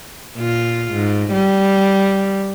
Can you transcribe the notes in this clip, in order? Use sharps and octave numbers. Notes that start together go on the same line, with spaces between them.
A#2 F4
G#2
G3